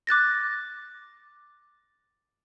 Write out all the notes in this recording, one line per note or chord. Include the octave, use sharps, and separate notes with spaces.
D6 F#6 A6 A#6